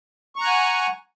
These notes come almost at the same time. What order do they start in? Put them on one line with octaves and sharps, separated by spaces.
C#6 A#5 F#6 G#5 F#5